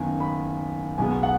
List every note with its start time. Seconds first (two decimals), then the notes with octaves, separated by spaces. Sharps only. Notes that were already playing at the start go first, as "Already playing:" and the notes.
Already playing: F#1 F#2 D#3 B3 G#5
0.20 B5
0.98 B1 B2 G#3 B3 G#5
1.23 F#5